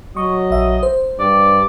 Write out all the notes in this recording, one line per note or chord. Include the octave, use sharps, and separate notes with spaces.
F#3 D#5 C#6
A#1 E5
C5
G2 D5